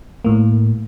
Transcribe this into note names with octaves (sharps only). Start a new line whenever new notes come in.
A2 A#3